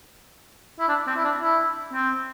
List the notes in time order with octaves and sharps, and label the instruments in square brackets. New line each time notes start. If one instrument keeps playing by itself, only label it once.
[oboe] E4
D4
C4
E4
D4
E4
C4